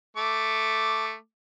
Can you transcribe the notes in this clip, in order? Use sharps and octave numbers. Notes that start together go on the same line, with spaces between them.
A3 D6